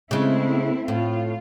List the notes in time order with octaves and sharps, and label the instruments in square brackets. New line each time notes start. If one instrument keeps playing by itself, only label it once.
[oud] C#3 G#3 [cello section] A3 C4 E4
[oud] A2 [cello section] F4